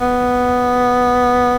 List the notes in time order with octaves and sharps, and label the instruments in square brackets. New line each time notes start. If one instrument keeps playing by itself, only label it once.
[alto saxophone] B3